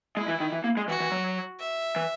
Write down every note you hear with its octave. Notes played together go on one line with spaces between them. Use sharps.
G#3 E4
E3
D#3
E3
A#3
G#3
E3 F#4
E3
F#3
E5
E3